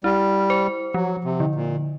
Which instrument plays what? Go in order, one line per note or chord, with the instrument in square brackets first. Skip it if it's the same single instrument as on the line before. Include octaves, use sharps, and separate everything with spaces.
[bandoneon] G3 [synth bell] E4
[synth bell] C5
[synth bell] F3 [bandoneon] F#3
[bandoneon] C3
[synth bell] D3
[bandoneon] A#2